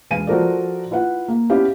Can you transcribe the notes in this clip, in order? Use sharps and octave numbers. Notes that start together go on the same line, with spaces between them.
E1 B4 F5 G#5 D#7
F3 F#4 A4 A#4 C5 D5
E4 F4 B4 F#5
A#3
B3 C#4 E4 G4 B4 F5